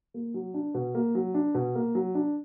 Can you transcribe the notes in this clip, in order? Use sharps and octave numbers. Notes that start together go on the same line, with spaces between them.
A#3
F#3
D4
B2
A#3
F#3
D4
B2
A#3
F#3
D4